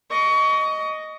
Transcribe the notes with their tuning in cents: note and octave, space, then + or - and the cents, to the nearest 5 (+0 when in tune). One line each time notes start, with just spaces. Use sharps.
D#5 +0 C#6 +30